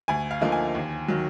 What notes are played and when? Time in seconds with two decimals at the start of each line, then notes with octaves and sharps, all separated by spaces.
0.08 D2 G#5
0.31 F5
0.41 D3 F3 A#3 D#4
0.52 G#5
0.75 D#2
1.08 D#3 F#3